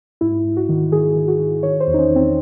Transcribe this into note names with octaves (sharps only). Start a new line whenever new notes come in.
G#2 E4
G#2
F#4
D#3
D#3 G#4
D#3
F#4
D#3
D#3 C#5
C5
E2
D#4
C#4
E2
C4